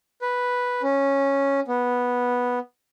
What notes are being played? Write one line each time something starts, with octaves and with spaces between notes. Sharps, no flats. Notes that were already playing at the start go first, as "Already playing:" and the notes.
B4
C#4
B3